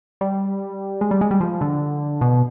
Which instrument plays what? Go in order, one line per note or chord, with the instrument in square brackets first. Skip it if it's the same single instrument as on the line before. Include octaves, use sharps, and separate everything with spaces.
[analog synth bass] G3
G#3
G3
G#3
G3
F3
D3
B2